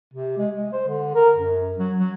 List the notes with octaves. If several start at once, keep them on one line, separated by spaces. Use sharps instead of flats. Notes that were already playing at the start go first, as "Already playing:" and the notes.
C3
G#3
G#3
C5
D3
A#4
F#2
F#3
F#3